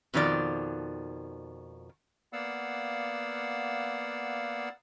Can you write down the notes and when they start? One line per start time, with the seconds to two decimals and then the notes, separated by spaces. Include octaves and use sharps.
0.14 F2 B2 D#3 F3 D5
2.33 A#3 B3 D5 F5 F#5 E6